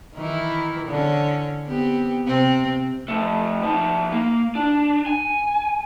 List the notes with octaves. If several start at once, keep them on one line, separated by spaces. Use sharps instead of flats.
D#3 E3 E4
D3 C#4
B3 C4 G4
C3 C4
F3 A3
F3 D#4
A#3
D4
G#5